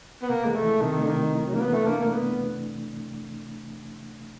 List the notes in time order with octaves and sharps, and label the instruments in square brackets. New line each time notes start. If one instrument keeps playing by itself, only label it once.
[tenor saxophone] B3
[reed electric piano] C3 [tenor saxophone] A#3
[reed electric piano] E3 [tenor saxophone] G#3
[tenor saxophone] A3
[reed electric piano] E3
[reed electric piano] C3 [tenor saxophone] D#3
[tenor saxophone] D3 [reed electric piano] A3
[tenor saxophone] D#3
[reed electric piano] C3
[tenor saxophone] D#3 [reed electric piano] E3
[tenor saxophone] F#3
[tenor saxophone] A#3 [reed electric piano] D4
[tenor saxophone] B3
[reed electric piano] E3 [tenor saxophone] A3
[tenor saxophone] A#3 [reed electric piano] D4
[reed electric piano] A3 [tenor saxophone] A#3
[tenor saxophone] B3